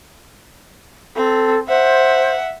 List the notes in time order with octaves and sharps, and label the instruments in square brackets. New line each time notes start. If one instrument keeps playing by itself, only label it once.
[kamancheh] C4 [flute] A4
[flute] C5 [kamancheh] E5 F#5